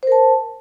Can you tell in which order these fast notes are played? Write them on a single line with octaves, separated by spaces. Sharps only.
C5 A#4 A5